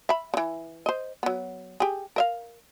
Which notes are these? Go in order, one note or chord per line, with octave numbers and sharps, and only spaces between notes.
E5 B5
C#3 E3
C5 D#5
F#3 B3
G4 G#4
A#4 E5 F5